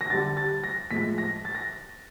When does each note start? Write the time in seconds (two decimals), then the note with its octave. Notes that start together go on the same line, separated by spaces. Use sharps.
0.01 A#6
0.10 D3 G3 A6
0.37 A6
0.64 A#6
0.91 A2 F3 G#3 B6
1.18 A#6
1.45 A6
1.55 A#6